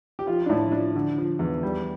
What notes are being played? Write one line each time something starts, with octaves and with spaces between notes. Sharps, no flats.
G4
F3 F4
D4
A2 E4
F3 D4
D3
F3
E2
G3